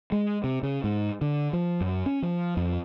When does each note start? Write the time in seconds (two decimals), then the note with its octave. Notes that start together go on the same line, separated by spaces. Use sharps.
0.12 G#3
0.44 C3
0.63 C#3
0.84 G#2
1.21 D3
1.53 F3
1.81 F#2
2.06 C#4
2.22 F3
2.57 F2